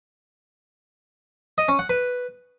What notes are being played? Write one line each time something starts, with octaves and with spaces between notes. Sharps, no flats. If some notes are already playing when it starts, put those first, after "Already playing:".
D#5
C#4
F#5
B4